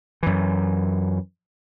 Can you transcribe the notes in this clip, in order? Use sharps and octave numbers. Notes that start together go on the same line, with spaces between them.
F#2 E3